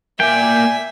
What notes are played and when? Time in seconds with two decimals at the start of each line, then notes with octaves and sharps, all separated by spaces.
0.20 A#3 D5 E5 G5 G#5